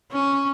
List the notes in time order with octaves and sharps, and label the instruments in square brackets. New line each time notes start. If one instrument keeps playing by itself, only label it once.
[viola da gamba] C#4